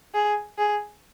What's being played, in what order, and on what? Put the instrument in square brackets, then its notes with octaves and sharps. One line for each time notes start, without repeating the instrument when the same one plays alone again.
[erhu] G#4
G#4